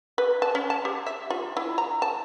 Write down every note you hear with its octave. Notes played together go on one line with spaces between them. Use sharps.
B4
A5
C#4
A5
G4
E5
F4
E4
A#5
A5